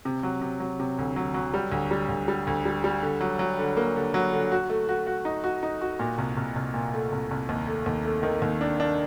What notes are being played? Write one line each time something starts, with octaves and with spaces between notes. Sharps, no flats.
C3
F#3
C3
F#3
C3
D2
F#3
F#3
G3
D2
G3
D2
G3
D2
G3
G3
D3
F#3
F#3
D3
A#3
D3
F#3
D3
F#4
A3
F#4
F#4
D#4
F#4
D#4
F#4
A#2
C2
C2
C2
A#2
A3
C2
C2
D#2
A3
D#2
A3
D#3
D#2
D4
D4